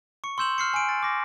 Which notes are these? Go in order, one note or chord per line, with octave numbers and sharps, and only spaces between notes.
C#6 C#7
C6 E6 G6 E7 F#7
F6 C7 C#7
G#5 D7
A6
D6 A#6